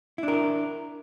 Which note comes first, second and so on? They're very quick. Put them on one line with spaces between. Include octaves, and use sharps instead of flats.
E4 D4 A#4